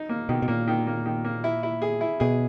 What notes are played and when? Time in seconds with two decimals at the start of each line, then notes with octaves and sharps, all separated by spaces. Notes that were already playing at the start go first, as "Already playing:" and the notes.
Already playing: D#4
0.09 A#3
0.29 B2 D#3
0.42 B2
0.48 A#2 A#3
0.68 D#3
0.87 A#3
1.06 D#3
1.25 A#3
1.44 E4
1.63 E4
1.82 G#4
2.01 E4
2.20 B2 G#4